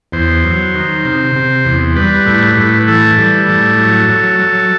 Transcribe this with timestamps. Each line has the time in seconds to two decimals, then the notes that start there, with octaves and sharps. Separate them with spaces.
0.12 E2 C5
0.44 F#3
0.74 D#3
1.05 C3
1.36 C3
1.65 E2
1.95 G3 B4
2.26 A2
2.57 A2
2.88 E3 A4
3.18 G3
3.48 A2
3.78 F#3
4.10 F#3
4.40 F#3